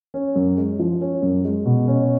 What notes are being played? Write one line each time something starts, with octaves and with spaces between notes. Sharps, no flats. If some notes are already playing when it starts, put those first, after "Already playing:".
C#4
F#2
G#3
F3
C#4
F#2
G#3
B2
C#4